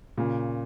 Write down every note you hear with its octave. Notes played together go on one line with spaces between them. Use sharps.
A#2 C#3